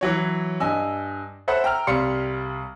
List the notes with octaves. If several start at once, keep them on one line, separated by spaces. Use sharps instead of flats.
E3 F#3 C#5
G2 D#5 G#5 E6
A4 C5 E5 F#5 B5
G5 A#5 E6 F6
C2 G3 F5 C6 C#7